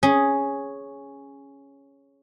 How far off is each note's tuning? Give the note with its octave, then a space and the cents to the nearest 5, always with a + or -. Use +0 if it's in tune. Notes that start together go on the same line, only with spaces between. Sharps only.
C#4 +0 G#4 +0